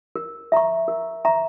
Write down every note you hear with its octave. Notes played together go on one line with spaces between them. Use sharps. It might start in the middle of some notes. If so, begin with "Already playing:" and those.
A#4
E5 A#5 C#6
A#4
E5 A#5 C#6